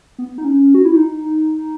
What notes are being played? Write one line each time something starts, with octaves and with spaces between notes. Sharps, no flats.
B3
D#4
C#4
F#4
E4
D#4